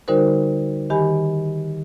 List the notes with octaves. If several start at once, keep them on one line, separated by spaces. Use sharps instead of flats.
D3 G3 D#4 F#4 A#4 C5
D#3 G4 G#5 B5